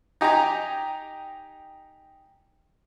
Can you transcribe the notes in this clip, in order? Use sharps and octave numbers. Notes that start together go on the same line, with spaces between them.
D#4 G4 G#5 A#5